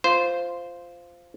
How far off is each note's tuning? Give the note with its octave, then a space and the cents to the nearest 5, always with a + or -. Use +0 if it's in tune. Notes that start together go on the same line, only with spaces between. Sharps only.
F4 -5 C5 -10